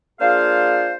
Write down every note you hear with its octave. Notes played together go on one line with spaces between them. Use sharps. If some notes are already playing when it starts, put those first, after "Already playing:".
A#3 D4 F4 G#4 C5 F5